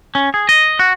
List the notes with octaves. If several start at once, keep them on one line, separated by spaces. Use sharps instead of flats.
C#4
G#4
D#5
F#4